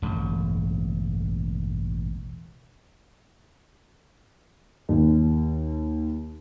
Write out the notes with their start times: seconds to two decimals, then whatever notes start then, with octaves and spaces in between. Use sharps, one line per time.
0.02 E1 A1 G2
4.89 D#2